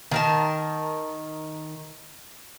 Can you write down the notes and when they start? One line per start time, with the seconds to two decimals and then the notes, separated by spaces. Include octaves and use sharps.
0.11 D#3 A#4 A5